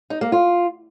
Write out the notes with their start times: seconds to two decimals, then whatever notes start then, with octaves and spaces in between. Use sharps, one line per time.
0.10 D#4
0.21 A#3
0.32 F4